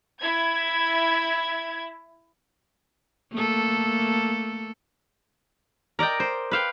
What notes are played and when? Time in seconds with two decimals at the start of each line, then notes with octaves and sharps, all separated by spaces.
0.18 E4 G#6
3.32 A3 A#3 A4
5.99 A#4 D5 D#5 G5
6.20 C5
6.51 B4 F5 G5